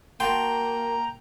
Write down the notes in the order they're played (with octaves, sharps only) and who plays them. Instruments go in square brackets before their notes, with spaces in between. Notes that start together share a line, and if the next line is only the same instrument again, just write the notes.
[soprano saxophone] A#3 [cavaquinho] F#4 A5 C6 [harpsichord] G5 [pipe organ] A#5